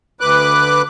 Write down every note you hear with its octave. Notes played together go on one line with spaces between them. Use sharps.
D2 B4 D6 F#6